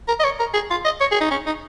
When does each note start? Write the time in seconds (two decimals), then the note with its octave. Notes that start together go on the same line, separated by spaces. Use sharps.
0.08 A#4
0.20 D#5
0.24 C#5
0.40 A#4
0.54 G#4
0.70 F4
0.85 D#5
1.01 C#5
1.11 G#4
1.21 D#4
1.31 C#4
1.46 D#4